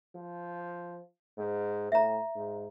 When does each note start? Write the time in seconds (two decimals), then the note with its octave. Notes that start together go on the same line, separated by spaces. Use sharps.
0.16 F3
1.38 G#2
1.92 A2 E5 A#5
2.36 G#2